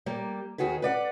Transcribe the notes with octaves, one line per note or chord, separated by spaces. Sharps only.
G3 A#3
D#2 D#3 F#4 G#4 B4
B4 D5 F#5